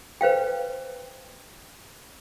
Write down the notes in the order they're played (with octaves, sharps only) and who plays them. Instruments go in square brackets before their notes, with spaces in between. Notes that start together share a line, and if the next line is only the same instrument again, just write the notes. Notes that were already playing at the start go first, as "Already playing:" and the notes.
[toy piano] B4 C5 F5 G5